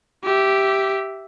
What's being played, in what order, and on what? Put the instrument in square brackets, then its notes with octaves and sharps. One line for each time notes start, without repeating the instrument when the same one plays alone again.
[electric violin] G4 E5